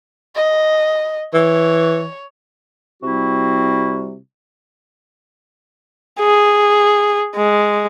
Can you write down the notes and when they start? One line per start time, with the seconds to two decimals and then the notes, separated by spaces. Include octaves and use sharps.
0.35 D#5
1.34 E3 C#5
3.03 C3 G3 C4 E4 F#4
6.20 G#4
7.35 G#3